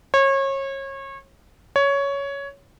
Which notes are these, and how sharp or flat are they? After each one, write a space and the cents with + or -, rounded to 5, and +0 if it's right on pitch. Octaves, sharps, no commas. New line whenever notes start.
C#5 -30
C#5 +10